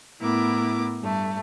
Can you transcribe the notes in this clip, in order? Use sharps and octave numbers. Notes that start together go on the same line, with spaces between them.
A2 B3 E4 A#4 D6
G2 A3